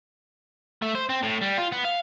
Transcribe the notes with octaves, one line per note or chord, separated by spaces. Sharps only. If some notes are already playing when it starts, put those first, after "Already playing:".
A3
C5
C4
A2
G3
F4
B3
F5